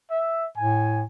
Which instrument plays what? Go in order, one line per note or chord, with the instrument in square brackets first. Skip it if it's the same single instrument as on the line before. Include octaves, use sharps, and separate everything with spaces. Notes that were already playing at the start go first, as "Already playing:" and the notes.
[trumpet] E5
[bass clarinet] A2 [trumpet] G#5